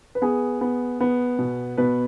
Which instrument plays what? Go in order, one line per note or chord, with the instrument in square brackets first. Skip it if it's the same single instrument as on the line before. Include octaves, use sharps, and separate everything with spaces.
[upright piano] B4
B3 G#4
B3
B3
B2
B2 B4